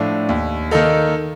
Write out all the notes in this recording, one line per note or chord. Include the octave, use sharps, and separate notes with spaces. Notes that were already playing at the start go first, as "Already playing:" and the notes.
Already playing: A2 F3 A3 D4
D#2
D#3 A#3 D#4 A4